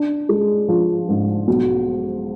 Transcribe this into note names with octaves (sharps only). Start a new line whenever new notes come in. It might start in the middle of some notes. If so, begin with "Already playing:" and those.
Already playing: D4
G#3
F3
G#2
B1